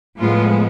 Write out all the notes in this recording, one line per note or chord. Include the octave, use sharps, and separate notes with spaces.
A2 F3 G#3 B3 F4